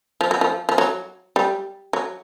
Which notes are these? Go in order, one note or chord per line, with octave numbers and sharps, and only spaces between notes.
F3
F#3
F3
F3
F#3
G3
F#3